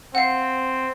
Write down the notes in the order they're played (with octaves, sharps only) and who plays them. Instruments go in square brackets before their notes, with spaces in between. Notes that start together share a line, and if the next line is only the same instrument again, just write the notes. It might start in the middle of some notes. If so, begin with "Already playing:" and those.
[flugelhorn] C4 [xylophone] F5 F#5